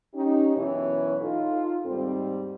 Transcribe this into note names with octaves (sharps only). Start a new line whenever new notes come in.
C#4 D#4 G4
F#2 B2 E3 E4 C#5
D#4 F4 A4
D#2 G#2 G3 C4